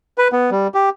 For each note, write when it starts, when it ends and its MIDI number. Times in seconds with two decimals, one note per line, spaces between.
0.18 0.28 71
0.32 0.50 59
0.51 0.67 55
0.74 0.89 67